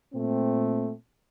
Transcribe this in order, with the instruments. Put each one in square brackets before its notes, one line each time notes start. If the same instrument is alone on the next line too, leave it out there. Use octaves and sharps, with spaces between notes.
[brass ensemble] A#2 A3 C4